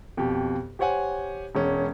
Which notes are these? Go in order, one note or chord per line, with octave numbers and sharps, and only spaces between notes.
F2 B2 G4
G4 C5 C#5 F#5 G#5
E1 G#3 C#4